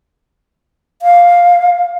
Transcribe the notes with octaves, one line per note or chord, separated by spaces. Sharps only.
F5